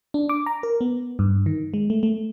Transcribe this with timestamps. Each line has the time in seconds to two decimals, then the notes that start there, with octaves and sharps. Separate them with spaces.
0.14 D4
0.29 D6
0.46 A#5
0.63 A#4
0.81 B3
1.19 G2
1.46 D#3
1.74 G#3
1.90 A3
2.03 A3